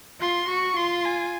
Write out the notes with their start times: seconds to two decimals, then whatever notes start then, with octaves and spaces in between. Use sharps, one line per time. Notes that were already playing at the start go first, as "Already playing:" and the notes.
0.20 F4 C6
0.48 F#4 C#6
0.76 F4 C6
1.04 G#5